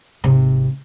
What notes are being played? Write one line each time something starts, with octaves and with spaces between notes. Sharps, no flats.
G#1 C3